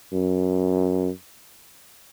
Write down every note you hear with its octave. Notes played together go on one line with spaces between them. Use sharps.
F#2